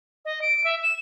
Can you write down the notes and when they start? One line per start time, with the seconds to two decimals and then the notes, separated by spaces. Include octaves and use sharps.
0.25 D#5
0.41 D7
0.64 E5
0.82 E7